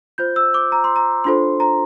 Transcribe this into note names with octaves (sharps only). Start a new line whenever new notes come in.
F4 C5 G6
E6
D6
A#5
C6
A#5
D4 F4 A4 C5 C6
A#5